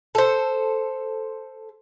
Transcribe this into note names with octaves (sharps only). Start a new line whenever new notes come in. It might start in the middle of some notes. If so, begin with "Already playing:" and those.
A4 C5